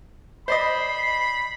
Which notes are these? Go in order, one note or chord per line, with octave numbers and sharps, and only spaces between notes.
C5 D5 D#5 B5 C7